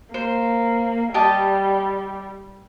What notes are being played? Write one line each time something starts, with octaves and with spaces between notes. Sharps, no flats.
A#3 C5
G3 G4 D#5 A5